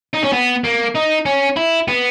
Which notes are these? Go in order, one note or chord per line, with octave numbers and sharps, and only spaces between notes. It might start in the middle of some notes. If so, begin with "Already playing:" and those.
D#4
C#4
B3
A#3
D#4
C#4
E4
B3